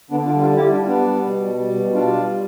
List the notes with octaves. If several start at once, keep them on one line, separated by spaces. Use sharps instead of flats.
D3 B3 D4
D4 F4
G3
D4 F4
G3 E4 G4
D4 F4
G3
B3 D4
G3
B2
G3
B2
G3 D4 F4
G3